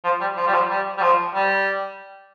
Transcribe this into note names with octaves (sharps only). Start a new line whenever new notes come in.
F3
G3
F3
G3
F3
G3
G3
F3
G3